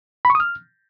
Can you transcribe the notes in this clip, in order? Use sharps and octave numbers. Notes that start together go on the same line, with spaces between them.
B5
C#6
D#6
F6